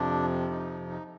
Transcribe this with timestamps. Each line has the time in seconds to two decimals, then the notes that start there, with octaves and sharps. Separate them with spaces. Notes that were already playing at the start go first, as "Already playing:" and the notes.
Already playing: F2 C3 F3 D4
0.50 D#4
0.89 D#4